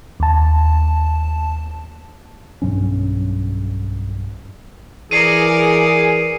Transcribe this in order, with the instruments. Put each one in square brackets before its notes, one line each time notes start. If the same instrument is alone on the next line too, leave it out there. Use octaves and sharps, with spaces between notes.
[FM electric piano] D#2 A5
[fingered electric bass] B1 G2 F#3 C#4
[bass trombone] E3 [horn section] G#4 [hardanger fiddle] A#4 D5 [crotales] C7 C#7 D#7